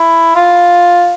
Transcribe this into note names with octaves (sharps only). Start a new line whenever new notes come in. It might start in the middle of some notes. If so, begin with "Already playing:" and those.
Already playing: E4
F4